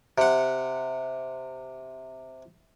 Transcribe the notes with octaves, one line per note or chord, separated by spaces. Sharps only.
C3 F#5